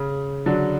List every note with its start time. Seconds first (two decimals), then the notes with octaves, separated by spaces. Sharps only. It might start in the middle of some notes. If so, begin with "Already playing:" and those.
Already playing: C#3
0.46 D3 F#3